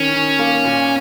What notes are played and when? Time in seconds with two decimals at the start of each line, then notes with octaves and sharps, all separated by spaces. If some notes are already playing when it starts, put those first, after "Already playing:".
Already playing: D#3 C#4
0.14 D#3
0.39 A#3
0.64 A#2